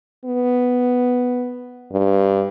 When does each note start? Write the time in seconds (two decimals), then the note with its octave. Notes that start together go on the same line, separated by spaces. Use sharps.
0.25 B3
1.92 G2